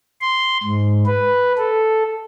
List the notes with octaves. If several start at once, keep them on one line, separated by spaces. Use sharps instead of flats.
C6
G#2
B4
A4